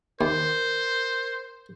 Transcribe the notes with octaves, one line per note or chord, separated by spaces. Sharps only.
D#2 A#4 C5